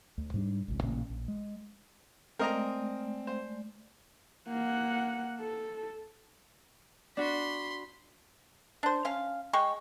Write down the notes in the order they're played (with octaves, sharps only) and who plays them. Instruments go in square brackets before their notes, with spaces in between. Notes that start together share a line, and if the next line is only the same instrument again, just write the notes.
[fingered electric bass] D2
G#2 G3 D4
G#1 C#2
A1 A#2 C#3 A#3
A#1
G#3
[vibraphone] G#3 A3 D5 [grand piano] C4 [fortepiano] A#4 D#5 A#5
[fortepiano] C5
[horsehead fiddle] A#3 F#5
A4
[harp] D4 F#4 [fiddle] B5 C6
[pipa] D4 C5
C#4 F5
G#3 G5 C#6